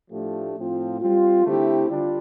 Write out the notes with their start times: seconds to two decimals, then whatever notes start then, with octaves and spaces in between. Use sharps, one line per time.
0.11 A2 F3 A3 D4 G4
0.55 A2 F3 C4 F4
0.99 G3 C4 F4
1.45 D3 A3 C4 E4 G4
1.89 D3 G3 D4 F4